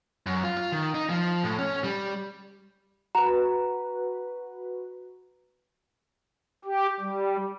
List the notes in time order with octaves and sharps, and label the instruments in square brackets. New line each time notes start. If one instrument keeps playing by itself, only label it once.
[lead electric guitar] F#2
F4
F4
D#3
D#4
F3
A2
C#4
G3
[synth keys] F#4 B4 [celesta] A#5
[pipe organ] G4
G3